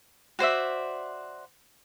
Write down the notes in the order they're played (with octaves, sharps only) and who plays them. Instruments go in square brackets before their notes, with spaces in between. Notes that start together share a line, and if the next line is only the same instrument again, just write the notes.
[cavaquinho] F#4 C5 D5 E5